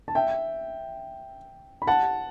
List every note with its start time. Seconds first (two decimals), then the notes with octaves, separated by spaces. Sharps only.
0.08 A5
0.15 E5 G5
1.82 B5
1.87 F#5 A5